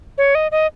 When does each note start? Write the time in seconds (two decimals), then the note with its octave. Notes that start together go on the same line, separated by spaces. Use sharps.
0.18 C#5
0.35 D#5
0.52 D#5